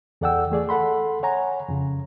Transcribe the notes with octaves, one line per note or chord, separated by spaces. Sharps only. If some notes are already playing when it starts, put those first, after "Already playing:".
E2 A4 D5 F#5 G5 E6
E3 A3 G#4 D5
A4 F#5 B5 C6
C#5 F#5 G#5 A#5
F2 C#3